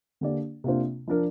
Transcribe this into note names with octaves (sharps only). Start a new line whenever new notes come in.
D3 A#3 D4 G4 D5
C3 A#3 D4 F4 C5
F3 D4 A#4